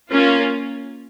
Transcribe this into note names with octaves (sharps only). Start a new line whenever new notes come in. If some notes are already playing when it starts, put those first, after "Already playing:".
A#3 C#4 F4